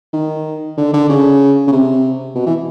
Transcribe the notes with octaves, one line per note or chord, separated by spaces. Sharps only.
D#3
D3
D3
C#3
C#3
C3
B2
E3